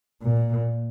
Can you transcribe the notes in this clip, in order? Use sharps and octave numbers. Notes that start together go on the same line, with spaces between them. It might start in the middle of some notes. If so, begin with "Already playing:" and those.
A#2